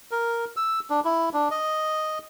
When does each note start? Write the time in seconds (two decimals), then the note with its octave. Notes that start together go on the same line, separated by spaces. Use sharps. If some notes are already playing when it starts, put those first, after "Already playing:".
0.11 A#4
0.57 E6
0.90 D4
1.04 E4
1.34 D4
1.51 D#5